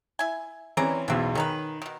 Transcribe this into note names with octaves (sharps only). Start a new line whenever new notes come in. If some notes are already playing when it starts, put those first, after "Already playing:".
E4 G#5
E3 C4 C#4 G#4 D5 A#5
B1 E2 B2 B3 C4
D#3 C#4 D#4 B4
B2 D#3